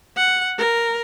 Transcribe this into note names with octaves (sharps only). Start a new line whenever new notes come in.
F#5
A#4